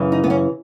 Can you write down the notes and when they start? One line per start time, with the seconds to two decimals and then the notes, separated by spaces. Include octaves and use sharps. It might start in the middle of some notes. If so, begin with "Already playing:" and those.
Already playing: F#2 C#3 E3
0.12 D#4
0.24 B3
0.30 C#4